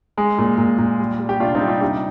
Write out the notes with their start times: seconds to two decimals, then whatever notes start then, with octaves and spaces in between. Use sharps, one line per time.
0.18 G#3
0.38 A#2
0.58 A#2
0.78 A#2
1.00 G3
1.20 G3
1.29 G4
1.40 C3 D4 F4
1.55 C4 D#4
1.61 G3
1.68 D4 F4
1.81 C3 D#4 G4